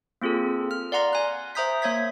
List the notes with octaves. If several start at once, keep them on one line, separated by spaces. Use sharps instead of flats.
A#3 C4 F4 G#4 A4
F6
D5 F5 F#5 A#5 C6 A#6
G#5 F#6
C5 E5 A#5 D#6 G6 B6
A#3 C#5 E5 G#6 B6